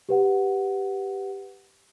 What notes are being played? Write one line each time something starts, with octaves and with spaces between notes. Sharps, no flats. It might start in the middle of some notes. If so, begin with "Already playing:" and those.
G4 B4 F#5